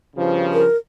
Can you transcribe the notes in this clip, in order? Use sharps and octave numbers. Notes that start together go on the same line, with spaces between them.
G2 C#3 F3
A#4